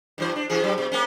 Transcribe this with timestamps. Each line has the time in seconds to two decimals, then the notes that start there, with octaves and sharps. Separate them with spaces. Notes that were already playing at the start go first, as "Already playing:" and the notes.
0.18 G2 E3 C5
0.36 D4
0.50 C3 E3 G#4
0.62 G2 F#3
0.78 B2
0.92 A#3 C4 C#4